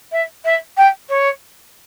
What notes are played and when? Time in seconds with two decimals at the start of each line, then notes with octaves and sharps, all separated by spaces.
0.12 E5
0.44 E5
0.77 G5
1.09 C#5